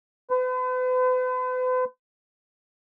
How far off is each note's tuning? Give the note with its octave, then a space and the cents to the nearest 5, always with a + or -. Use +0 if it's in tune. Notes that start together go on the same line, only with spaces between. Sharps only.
B4 +45